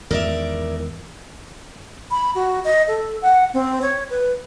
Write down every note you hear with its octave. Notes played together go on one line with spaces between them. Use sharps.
E2 G#2 D#3 A#4 D5 E5
B5
F#4
D#5
A4
F#5
C4
C#5
B4